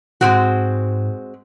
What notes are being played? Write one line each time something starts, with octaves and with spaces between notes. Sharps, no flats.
G#2 G#3 C4 F#4